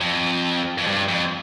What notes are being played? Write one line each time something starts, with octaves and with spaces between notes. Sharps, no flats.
F2
F2
G2
F2